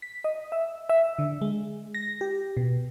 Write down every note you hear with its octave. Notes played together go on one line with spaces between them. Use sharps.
B6
D#5
E5
E5
D3
G#3
A#6
G4
B2